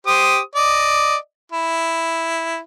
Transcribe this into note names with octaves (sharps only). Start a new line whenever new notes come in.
G4 C5 D#6
D5 D#5
E4